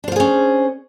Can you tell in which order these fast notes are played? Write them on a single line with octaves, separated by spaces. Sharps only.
D4 C5 F4 G#4 C#4